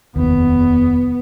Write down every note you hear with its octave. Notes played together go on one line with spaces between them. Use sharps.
F1 D#2 B3